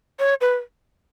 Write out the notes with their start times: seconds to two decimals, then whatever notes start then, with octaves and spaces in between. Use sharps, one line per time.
0.19 C#5
0.41 B4